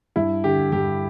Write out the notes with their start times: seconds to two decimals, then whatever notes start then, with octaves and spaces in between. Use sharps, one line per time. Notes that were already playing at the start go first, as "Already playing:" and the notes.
0.16 G2 E4
0.44 D3 G4
0.72 G2 G4